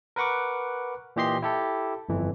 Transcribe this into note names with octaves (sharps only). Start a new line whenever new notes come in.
A#4 B4 F#5 C#6 D6
A#2 E3 G4 D#5 C6 C7
E4 G4 A4
G1 F2 E3